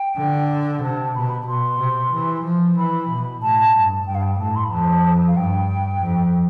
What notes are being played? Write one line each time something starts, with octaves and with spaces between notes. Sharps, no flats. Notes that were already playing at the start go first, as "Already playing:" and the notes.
Already playing: G5
D3
C3 A5
B2 B5
A5
B5
B2 C6
C3
E3
F3
E3 B5
B2
A2 A5
G2
G2 G5
F5
G5
A2 A5
C6
B5
F2 A5
F5
G2 G5
F2